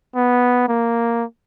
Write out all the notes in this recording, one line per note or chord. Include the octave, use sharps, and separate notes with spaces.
B3
A#3